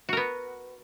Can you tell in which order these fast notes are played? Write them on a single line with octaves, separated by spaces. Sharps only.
F#4 A#4 B3